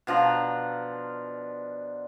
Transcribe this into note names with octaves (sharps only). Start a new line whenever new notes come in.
B2 F3 D4 A#5